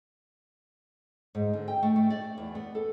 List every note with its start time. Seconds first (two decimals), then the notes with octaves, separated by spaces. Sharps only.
1.35 G#2
1.53 D3
1.68 G5
1.83 A3
1.96 A3
2.10 D5
2.38 E2
2.55 B3
2.75 A4